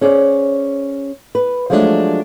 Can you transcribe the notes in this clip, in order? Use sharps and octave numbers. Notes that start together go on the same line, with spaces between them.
C#4 G#4 C5 D5
B4
F3 F#3 G#3 A3 D4